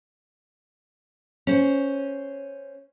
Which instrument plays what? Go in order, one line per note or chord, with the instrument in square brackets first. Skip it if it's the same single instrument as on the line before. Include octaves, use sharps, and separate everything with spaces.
[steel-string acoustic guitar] C#4 C5